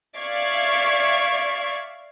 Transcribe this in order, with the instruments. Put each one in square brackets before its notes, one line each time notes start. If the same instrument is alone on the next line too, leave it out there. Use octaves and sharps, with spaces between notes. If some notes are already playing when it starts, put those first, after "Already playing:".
[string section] D5 E5 F5 C#6 G#6